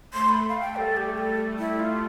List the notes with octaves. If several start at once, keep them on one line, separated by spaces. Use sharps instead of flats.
A3 C6
B5
F5
G5
G3 A4
G4
A4
E4
F4